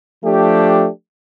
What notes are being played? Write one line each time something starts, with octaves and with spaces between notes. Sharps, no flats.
F3 A3 D4 G4